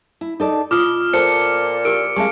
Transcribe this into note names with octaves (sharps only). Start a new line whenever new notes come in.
E4
D#4 A4 D5
B2 F4 D6 D#6 F6
A#2 A4 C5 C#7
G4 A#4 D7
G#3 C4 F5 A5 C#6